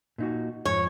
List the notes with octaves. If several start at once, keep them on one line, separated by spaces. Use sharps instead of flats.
A#2 D#4 F#4
F2 G#2 C#5